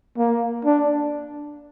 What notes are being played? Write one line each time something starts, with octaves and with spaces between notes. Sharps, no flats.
A#3
D4